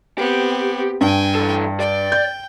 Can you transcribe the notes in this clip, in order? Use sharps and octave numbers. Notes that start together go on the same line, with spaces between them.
B3 C4 G4
G2 G5 G#5
E3 A4
D5 G5
G6